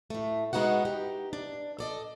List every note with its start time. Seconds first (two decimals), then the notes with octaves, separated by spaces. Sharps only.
0.10 A2 A3
0.53 G#3 B3 D#4 F#4 F#5
0.85 D#4 G4
1.33 D4
1.79 A4 D5 D#5